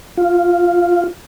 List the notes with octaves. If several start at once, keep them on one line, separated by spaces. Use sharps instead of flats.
F4